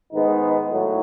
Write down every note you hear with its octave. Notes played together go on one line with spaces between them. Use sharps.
G#2 D#3 G#3 B3 D#4
A2 F#3